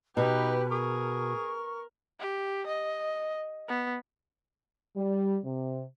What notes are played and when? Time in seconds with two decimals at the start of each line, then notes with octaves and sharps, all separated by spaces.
0.17 B2 D#4 G4 B4
0.71 G#4 A#4 C#6
2.20 G4
2.67 D#5
3.68 B3
4.97 G3
5.44 C3